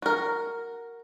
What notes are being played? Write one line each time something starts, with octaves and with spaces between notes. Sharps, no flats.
F#4 A#4